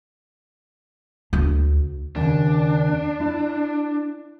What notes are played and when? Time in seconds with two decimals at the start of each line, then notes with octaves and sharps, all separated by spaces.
1.33 D2
2.16 D#2 C#3 D4
3.20 E4